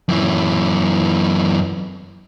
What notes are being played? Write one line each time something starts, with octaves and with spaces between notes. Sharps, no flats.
F#2 E3